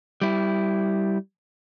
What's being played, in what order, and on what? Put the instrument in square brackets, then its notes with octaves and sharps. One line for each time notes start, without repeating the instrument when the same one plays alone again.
[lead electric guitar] G3 E4